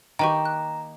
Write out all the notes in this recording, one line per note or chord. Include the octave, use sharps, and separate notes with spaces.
D#3 A#3 D#4 G4 B4 G5 A#5 C#6
F#6